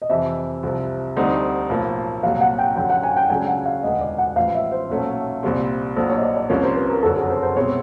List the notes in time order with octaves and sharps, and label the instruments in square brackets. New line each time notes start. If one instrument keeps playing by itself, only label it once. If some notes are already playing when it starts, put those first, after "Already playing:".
[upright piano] D#5
[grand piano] F2 C3 E3 [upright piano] E5
[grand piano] C2 C3 F3
D2 D3 G3 C4 D#4
B1 A2 F3 A#3
[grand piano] C2 A#2 F#3 [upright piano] F5
[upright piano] F#5
G5
[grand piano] F#2 D3 F#3 [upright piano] G5
[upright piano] F#5
G#5
G5
[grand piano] C#2 C#3 F#3 A3 D4 [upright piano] G#5
[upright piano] F#5
F5
[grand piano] E1 D2 D3 [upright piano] D#5
[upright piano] D5
F#5
[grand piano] A1 A2 F3 [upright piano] F5
[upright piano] E5
C5
[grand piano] B1 A#2 F#3 A3 C#4
C2 A#2 G3 C4
[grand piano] A#1 A#2 F#3 A3 D4 [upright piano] C5
[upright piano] C#5
D#5
D5
D5
[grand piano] C2 C3 F3 A#3 C#4 [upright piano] C#5
[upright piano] C5
B4
A#4
[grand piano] F#1 F2 D3 F#3 [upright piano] A4
[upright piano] G#4
C5
C5
[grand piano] C2 B2 G#3 C4 E4 [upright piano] C#5